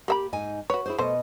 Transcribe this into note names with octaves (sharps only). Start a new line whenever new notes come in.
A#3 G4 E5 B5
G#2 D#4 G#5
F#4 B4 C#5
E4 G#4 C5
B2 A3 C5 D#5